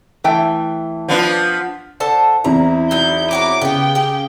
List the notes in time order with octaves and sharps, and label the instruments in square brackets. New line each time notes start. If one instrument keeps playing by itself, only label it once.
[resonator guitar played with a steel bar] E3 A3 G5
[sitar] F3 B3 D4
[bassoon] D3 [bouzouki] A4 C5 A5
[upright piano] E2 C4 [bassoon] E4 [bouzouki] A#5
[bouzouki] F#3 D#4 [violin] G6
[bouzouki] F#4 G4 A#4 [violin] C#5 D6
[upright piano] C#3 [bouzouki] B3 G4 [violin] G5
[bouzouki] G4 G#4